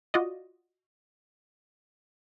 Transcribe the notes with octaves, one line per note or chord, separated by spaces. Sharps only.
F4 F#4 D5 D#5